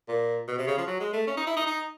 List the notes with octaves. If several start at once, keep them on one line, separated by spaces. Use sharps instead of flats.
A#2
B2
C3
C#3
F3
F#3
G#3
A3
C#4
D#4
E4
D#4
D#4